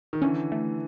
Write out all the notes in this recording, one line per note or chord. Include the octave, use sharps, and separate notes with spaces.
D#3
D3 E3 C#4
A3